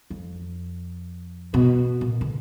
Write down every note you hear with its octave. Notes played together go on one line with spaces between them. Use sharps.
F2
B2
A#2
D3